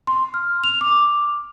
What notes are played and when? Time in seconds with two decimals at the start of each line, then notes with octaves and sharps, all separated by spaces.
0.07 C6
0.34 F6
0.64 F7
0.81 D6